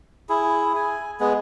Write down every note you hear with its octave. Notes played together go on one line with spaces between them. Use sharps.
E4 G#4
G#5
G#3 B3 G#4